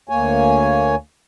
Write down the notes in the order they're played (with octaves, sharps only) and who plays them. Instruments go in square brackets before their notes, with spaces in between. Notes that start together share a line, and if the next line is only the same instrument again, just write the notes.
[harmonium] D2 A#3 C#5 G#5